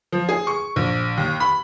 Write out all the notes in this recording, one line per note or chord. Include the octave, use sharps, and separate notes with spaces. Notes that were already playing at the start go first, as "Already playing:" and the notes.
F3
G#4
C#6
A#1
D#2
B5